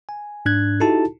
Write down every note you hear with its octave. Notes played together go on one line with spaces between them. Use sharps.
G#5
G#2 D4 F#6 G#6
D#4 E4 F#4 G4 A4 A5